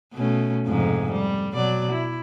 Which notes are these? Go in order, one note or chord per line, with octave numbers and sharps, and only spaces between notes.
B2 A3 C#4
F2 G#2 C3
G3
B2 F#3 D5
E4